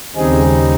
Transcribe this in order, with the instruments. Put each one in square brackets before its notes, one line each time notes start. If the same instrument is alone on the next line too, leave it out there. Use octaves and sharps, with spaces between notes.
[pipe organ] D#2 C#3 G3 C4 D#4 G#4